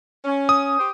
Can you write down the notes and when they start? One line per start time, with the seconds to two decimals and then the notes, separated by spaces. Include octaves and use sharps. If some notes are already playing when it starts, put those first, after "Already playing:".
0.25 C#4
0.49 D#6
0.79 G4 C5